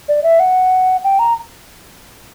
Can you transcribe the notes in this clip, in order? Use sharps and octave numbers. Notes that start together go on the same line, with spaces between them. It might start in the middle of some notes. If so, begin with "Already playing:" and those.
D5
E5
F#5
G5
A#5